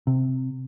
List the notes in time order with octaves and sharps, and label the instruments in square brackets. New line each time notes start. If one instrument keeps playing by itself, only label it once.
[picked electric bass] C3